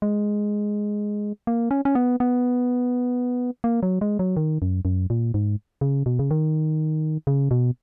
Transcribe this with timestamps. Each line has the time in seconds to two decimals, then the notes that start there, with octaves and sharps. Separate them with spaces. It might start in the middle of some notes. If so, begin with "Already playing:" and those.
0.02 G#3
1.47 A#3
1.71 C#4
1.85 C#4
1.95 B3
2.20 B3
3.64 A#3
3.83 F#3
4.01 G#3
4.19 F#3
4.37 D#3
4.62 F#2
4.85 F#2
5.10 A#2
5.34 G#2
5.81 C#3
6.06 B2
6.19 C#3
6.31 D#3
7.27 C#3
7.51 B2